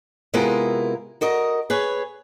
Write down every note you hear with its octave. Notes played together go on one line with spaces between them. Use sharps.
C3 G#3 B3 E4 F4 A#4
F#4 A#4 D#5
G#4 B4 C#5